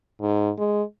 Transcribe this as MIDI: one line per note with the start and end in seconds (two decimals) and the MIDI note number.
0.21 0.50 44
0.58 0.82 56